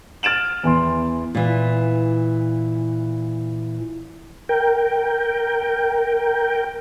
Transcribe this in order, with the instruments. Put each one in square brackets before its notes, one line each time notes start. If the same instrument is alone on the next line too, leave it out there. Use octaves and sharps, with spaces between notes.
[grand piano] F6 A6 D7 E7 F#7
E2 E3 C6
[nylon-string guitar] A#2 E3
[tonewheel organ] A#4 G5